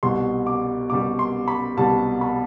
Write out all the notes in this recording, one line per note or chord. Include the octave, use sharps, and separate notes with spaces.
C2 B2 G3 C6
D6
C2 B2 G3 D6
C6
B5
C2 B2 G3 A5
B5